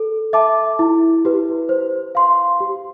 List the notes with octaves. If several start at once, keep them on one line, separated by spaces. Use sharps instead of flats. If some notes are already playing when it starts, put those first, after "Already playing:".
Already playing: A4
E5 A5 D6
E4
G4 B4
C5
F5 C6
G4